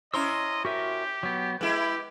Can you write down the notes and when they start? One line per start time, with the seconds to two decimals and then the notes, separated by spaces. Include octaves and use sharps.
0.14 C#4 E4 C5 D#5 A#5 C6 E6
0.65 F#4 G4 A#4 E5
1.23 F#3 B3
1.61 G#3 E4 G4 B4